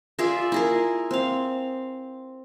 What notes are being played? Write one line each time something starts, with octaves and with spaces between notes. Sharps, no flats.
F4 G#4 D5 E5
E4 G#4 A#4
C4 F5